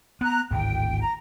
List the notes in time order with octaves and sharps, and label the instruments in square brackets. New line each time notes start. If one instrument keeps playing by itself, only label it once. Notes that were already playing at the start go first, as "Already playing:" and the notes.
[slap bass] B3 [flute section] A#5 F#6
[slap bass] D1 G#1 D2 [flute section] G5
[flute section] A#5